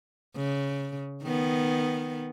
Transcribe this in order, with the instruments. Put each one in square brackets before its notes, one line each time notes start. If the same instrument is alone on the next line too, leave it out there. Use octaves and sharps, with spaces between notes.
[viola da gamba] C#3
D#3 B3